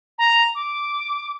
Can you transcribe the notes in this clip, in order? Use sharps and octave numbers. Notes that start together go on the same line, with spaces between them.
A#5
D6